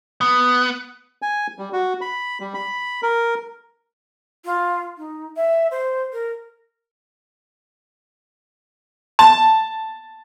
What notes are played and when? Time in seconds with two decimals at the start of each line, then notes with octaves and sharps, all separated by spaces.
0.21 B3
1.22 G#5
1.59 G3
1.73 F#4
2.01 B5
2.40 G3
2.54 B5
3.03 A#4
4.45 F4
4.98 D#4
5.36 E5
5.71 C5
6.13 A#4
9.19 A5